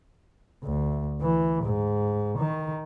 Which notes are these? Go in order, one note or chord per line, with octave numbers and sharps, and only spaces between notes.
D2
E3
G#2
D#3